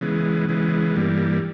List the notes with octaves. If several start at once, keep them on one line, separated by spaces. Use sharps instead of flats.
C#3 E3 G#3 B3
C#3 E3 G#3 B3
G2 E3 G3 A#3